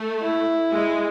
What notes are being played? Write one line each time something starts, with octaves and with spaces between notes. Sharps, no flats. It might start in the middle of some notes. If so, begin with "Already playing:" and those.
Already playing: A3
E4
G#3